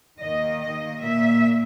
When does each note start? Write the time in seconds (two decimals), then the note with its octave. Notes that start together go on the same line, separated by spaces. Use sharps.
0.22 D#2 D#3 A#3 D#5
0.61 D#5
1.01 A#2 A#3 E5